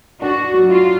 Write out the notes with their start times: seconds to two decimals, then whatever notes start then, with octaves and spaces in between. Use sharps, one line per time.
0.22 D4 F#4
0.53 F#3
0.69 F4